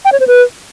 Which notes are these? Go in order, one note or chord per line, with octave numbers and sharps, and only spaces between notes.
G5
C#5
C5
B4